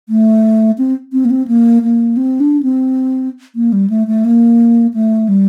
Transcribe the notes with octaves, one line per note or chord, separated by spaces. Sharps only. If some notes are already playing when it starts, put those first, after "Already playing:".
A3
C4
C4
A#3
C4
A#3
A#3
C4
D4
C4
A#3
G3
A3
A3
A#3
A3
G3